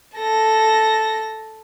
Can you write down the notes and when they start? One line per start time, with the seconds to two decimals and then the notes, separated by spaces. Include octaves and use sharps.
0.16 A4 A#6